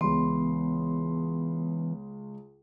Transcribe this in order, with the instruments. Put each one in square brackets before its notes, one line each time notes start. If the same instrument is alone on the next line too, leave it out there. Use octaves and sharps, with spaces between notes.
[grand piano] C#2 C6 [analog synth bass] E3 [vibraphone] B3